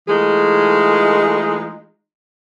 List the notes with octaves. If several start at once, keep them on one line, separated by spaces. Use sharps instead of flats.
E3 G#3 A3 D#4 F4 G#4